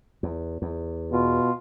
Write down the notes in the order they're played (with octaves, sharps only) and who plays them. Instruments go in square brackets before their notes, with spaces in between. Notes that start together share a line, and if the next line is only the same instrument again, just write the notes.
[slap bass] E2
E2
[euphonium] B2 [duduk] F4